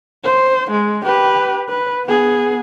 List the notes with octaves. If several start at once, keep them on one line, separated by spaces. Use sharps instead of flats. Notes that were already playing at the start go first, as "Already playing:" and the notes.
C5
G#3
G4 B4
B4
B3 G#4